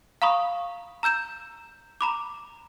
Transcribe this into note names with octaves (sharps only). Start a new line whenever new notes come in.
F5 A#5 B5 C#6 D#6
A#5 E6 G6 E7
A#5 B5 D6